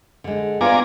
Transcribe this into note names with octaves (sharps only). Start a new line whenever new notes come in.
D3 G#3
B3 E4 F4 D5 G#5 A#5 D6